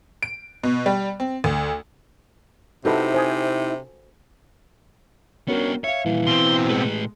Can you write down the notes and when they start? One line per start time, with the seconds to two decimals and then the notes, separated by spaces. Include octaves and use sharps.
0.23 D7
0.63 B2
0.86 G3
1.20 C4
1.44 D2
2.85 C3 D#4 E4 F#4 A4 B4
3.14 C5 G#5 D#6
5.48 B3 C#4 D4 F#4 A#4
5.84 C#5 E5 F5
6.05 A#2 E3 G3
6.27 B2 C4 C6
6.69 A2 G#3 B4